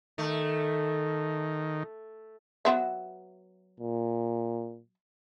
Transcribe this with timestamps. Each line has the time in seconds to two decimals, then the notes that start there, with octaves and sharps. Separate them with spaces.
0.18 D#3 A3
2.65 F#3 B3 E5
3.80 A#2